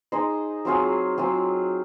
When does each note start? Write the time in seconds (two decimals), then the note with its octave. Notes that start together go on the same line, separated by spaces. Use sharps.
0.12 D#4 G#4 C5 D#5
0.65 F#3 C4 F4 G#4
1.18 F#3 C4 F4 G#4